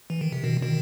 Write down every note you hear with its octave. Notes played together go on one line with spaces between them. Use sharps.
E3
D#3
C3
B2 D#3
B2 D#3